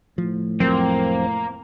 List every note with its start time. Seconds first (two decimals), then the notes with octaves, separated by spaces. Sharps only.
0.18 A2 F3
0.60 F1 F3 F#3 A#3 C4